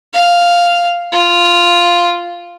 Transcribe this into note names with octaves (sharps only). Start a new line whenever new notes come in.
F5
F4